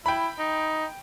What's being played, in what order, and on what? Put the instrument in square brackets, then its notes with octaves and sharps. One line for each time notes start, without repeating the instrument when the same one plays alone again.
[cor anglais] E4 [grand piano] G5 B5
[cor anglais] D#4